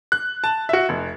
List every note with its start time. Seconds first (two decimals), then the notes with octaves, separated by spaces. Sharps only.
0.12 F#6
0.44 A5
0.69 F#4 E5
0.89 F1